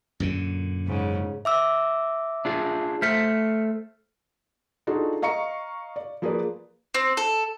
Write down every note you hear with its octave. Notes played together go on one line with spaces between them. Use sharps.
F#2 A#2 D3
G#2 C#3
E5 D6 E6
D4 F4 G#4
A3 C5 E5 F6 C#7
D4 D#4 F4 F#4 G#4 A4
D#5 F5 A#5 C#6 C#7
D5
F3 A#3 G#4 A#4 B4 D5
C4
A4